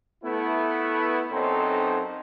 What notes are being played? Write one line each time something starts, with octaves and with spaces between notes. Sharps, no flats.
A3 B3 E4
B1 F#2 C4 D#4 A4 C5